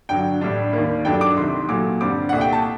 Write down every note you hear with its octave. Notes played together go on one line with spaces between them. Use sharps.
G2 D3 F#3 G5
A2 G3 D4
D#2 D#3 G3 A#3
G2 F#3 A3 D4 G5
D6
C2 C3 D#3 C6
A#2 F#3 A3 D6
G2 D3 G3 C4 D6
C2 A#2 A3 F#5
G5
A5